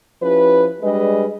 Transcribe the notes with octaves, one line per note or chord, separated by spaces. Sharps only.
F3 C#4 E4 G4 B4
G3 G#3 D4 G#4 B4 D#5